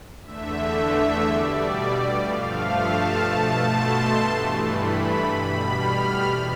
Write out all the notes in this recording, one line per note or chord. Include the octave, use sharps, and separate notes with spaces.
E2 D3 A3 E5
E5
B2 G3 D5
G2 F3 A3 F5
A5
B2 A3 A5
C6
G2 E3 A3
B5
B2 G3 B5
F6
E2 C3